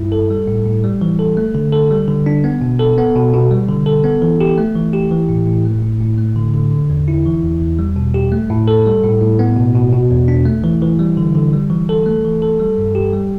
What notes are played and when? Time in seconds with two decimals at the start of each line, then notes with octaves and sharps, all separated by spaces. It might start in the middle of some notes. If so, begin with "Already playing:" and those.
Already playing: G2 G3 E4
0.12 A4
0.30 G3
0.47 A2
0.66 A2
0.84 G3
1.01 E3
1.19 A4
1.37 A3
1.55 D3
1.72 A4
1.91 G3
2.08 D3
2.26 D4
2.44 B3
2.61 B2
2.79 A4
2.98 B3
3.15 B2
3.33 B2
3.51 G3
3.69 D3
3.86 A4
4.04 B3
4.22 E3
4.41 G4
4.58 A3
4.76 E3
4.93 G4
5.11 E3
5.29 A2
5.47 A2
5.65 A3
5.82 A2
6.00 A2
6.18 A3
6.36 D3
6.54 D3
6.72 D3
6.90 E2
7.08 E4
7.26 E3
7.43 E2
7.61 E2
7.79 G3
7.96 B2
8.14 G4
8.32 A3
8.50 A2
8.68 A4
8.86 G3
9.04 A2
9.21 A2
9.39 B3
9.56 B2
9.75 B2
9.93 B2
10.11 E2
10.28 D4
10.46 A3
10.64 E3
10.82 E3
10.99 G3
11.17 D3
11.35 D3
11.53 G3
11.70 E3
11.89 A4
12.06 A3
12.25 E3
12.42 A4
12.60 G3
12.78 G2
12.95 G4
13.13 G3